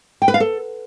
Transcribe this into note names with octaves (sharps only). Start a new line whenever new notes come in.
G5
B4
F5
A4